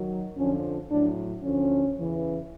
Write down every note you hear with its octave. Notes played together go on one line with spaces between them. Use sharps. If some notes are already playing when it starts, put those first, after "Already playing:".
Already playing: D#3 F#3
F2 D3 F3 C#4
A2 F#3 D4
D2 D3 F3 C#4
E2 C#3 E3